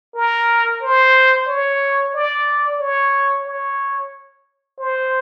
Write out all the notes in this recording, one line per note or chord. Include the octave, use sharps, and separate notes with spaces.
A#4
C5
C#5
D5
C#5
C#5
C5